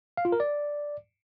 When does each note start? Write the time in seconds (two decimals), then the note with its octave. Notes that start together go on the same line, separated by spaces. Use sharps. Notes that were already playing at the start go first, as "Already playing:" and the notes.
0.17 F5
0.25 F4
0.32 A#4
0.40 D5